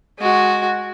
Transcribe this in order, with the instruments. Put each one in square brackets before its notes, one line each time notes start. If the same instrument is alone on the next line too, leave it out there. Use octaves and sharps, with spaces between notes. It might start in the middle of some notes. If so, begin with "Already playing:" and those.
[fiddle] G#3 F#4